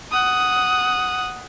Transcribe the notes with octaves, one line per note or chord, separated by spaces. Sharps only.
F#5 D#6